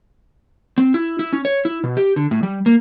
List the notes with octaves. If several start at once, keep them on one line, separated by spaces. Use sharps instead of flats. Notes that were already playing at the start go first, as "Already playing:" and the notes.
C4
E4
E4
C#4
C#5
E4
B2
G4
D3
A2
G3
A#3